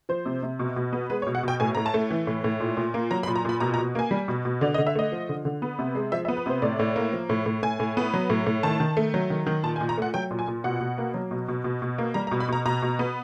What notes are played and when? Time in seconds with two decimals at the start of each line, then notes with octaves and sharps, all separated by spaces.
0.09 F3 C5
0.26 C3
0.43 C3
0.59 B2
0.76 B2
0.93 B3
1.10 G#3 B4
1.22 C#5
1.27 B2
1.35 F#5
1.43 B2 G5
1.60 A2 G#5
1.75 A2 A#5
1.86 A5
1.94 A3
2.10 E3
2.27 A2
2.44 A2
2.60 A#2
2.77 A#2
2.94 A#3
3.11 F#3 A#5
3.23 B5
3.27 A#2
3.36 A#5
3.45 A#2 B5
3.60 B2 A#5
3.74 A#5
3.78 B2
3.95 A#3 G#5
4.11 G3
4.28 B2
4.45 B2
4.61 D3 D5
4.74 D#5
4.78 D3
4.87 E5
4.95 A3 D#5
5.12 F3
5.29 D3
5.45 D3
5.62 B3
5.79 C3
5.95 G#3
6.12 F3 E5
6.25 E5
6.28 B3
6.37 B4
6.46 C3 C5
6.62 A2 D5
6.79 A2
6.96 A#3
7.13 F3
7.29 A2
7.46 A2
7.63 A2 G#5
7.79 A2
7.97 B3
8.14 F#3
8.30 A2
8.46 A2
8.63 D#3 A5
8.80 D#3
8.97 A3
9.14 F#3
9.30 D#3
9.47 D#3
9.63 A#2 A5
9.76 G#5
9.81 A#2
9.89 A#5
9.97 A3 F#5
10.14 F#3 G5
10.31 A#2
10.39 G#5
10.48 A#2
10.64 B2 F#5
10.81 B2
10.98 A#3
11.14 F#3
11.31 B2
11.48 B2
11.64 B2
11.82 B2
11.98 A#3
12.14 G3 A#5
12.27 A#5
12.31 B2
12.40 B5
12.49 B2 A#5
12.66 B2 A#5
12.82 B2
12.99 B3